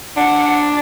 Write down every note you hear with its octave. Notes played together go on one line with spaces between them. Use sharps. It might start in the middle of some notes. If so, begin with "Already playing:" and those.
D4 F#5